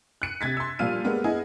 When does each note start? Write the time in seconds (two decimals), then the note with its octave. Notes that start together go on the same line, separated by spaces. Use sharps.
0.22 F#6 C#7 D#7
0.41 C3 G#6 A6 B6
0.57 C6 E6
0.79 A#2 F3 G3 F5 F6 D#7
1.04 G3 G#3 A#3 B3
1.24 B3 E4 G#4 D#5 G#5